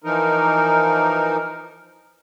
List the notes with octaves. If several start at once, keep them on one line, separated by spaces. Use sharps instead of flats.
E3 F3 D#4 A#4